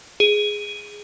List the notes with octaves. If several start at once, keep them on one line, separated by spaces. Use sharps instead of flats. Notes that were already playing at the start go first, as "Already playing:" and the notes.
G#4